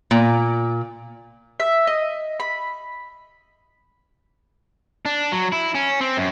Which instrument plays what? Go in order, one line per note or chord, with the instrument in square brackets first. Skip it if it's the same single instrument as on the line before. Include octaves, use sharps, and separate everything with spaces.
[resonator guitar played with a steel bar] A#2
[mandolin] E5
D#5
B5
[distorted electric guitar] D4
F#3
E4
C#4
C4
F#2